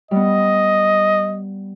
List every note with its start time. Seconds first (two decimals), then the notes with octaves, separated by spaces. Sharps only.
0.11 G3 B3 D#5